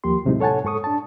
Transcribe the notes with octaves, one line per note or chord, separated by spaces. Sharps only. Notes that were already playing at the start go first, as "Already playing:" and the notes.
D#2 F3 A#3 G4 C6
A2 C3 F#3 G#3 D#4 E4
A4 C#5 F#5 G#5 A5
G#2 A4 C#6 D#6
D4 A5